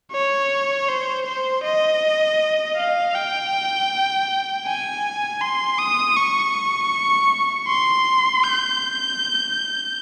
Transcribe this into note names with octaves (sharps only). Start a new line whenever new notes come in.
C#5
C5
C5
D#5
F5
G5
G#5
C6
D#6
C#6
C6
G6